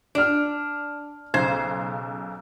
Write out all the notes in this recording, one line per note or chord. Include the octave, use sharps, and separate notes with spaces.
D4 D5 F6
B1 C#3 C5 G#6